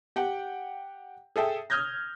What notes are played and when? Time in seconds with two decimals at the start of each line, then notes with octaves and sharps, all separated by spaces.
0.16 G4 F#5 G5
1.36 G#4 A4 E5 G5
1.70 D#6 F6 G6 G#6 A#6